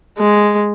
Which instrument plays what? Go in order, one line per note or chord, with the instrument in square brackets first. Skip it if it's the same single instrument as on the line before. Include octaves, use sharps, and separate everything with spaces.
[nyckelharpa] G#3